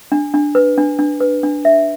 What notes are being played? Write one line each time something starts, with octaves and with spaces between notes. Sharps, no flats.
D4
D4
B4
D4
D4
B4
D4
E5